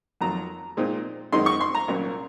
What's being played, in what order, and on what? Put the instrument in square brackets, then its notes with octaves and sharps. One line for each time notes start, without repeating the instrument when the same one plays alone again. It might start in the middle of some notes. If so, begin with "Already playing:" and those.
[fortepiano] F2 D#3 F#3 A#5
A#2 G#3 C4 D#4
F#2 D#3 G#3 C4 D#4 C6
C#6
C6
A#5
C2 A#2 F#3 A#3 C#4